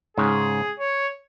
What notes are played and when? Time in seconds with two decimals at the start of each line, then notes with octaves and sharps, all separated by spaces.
0.17 G#2 C#3 G#4
0.80 C#5